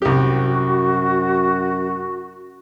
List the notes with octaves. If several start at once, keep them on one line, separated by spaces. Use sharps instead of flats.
C2 F#2 F#4 G4